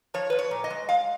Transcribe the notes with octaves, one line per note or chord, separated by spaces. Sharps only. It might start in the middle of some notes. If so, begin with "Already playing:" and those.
F3 C#5
F3 B4
C#5
A#2
D#5
G#3
G#3 F5